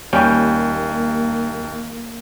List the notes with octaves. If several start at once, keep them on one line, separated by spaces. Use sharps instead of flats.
D#2 G3 A#3 C#4 G5